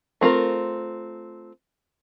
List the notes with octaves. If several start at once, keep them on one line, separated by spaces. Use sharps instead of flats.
A3 C4 F4 A#4